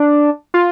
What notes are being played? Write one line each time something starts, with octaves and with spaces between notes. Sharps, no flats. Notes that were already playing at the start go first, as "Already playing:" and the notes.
Already playing: D4
F4